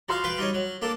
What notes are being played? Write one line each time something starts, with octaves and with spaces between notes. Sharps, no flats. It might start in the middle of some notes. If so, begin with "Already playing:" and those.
F3 F#4 F5 C6 F6
B4 F5 G5
G3 D#4 C#5
F#3
A#3 D4 A4